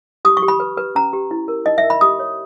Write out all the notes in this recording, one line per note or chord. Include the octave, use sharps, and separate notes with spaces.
G4 D#6
C#6
G4
B5
B4
B4
C#4 A#5
G4
E4
A#4
D#4 D#5
E5
A#4
B5
G4 D#6
C#5